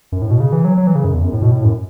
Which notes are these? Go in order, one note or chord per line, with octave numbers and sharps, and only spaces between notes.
F#2
A2
B2
C#3
E3
F#3
F#3
E3
C#3
F#2
E2
F#2
A2
B2
A2
F#2